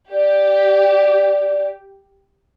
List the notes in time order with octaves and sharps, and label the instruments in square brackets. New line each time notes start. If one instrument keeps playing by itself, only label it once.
[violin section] G4 [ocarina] D5